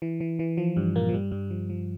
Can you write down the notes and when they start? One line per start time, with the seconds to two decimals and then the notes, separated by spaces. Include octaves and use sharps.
0.02 E3
0.20 E3
0.39 E3
0.57 F3
0.76 G2 G3
0.95 A#2 A#3
1.09 F3
1.13 G2 G3
1.31 G2 G3
1.50 F3
1.70 F3